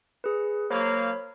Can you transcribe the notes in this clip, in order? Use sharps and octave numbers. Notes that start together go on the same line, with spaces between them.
G#4 B4
F#3 A#3 C5 C#5 F5 B5